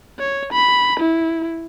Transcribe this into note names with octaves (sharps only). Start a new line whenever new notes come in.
C#5
B5
E4